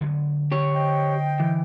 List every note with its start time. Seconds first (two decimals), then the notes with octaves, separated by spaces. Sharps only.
0.01 D3 F#3 B3
0.52 G4 C#5
0.74 C5 D#5 G5
1.40 E3